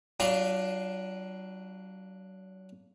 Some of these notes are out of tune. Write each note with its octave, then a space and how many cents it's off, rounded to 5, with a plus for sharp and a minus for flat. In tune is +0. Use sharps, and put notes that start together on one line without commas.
F#3 +35 D4 +5 F4 +0